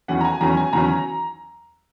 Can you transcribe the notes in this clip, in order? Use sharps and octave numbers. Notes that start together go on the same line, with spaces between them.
E2 D#3 F#3 C#4 F#5
A#5
G#5
E2 D#3 F#3 C#4 A#5
G#5
E2 D#3 F#3 C#4 A#5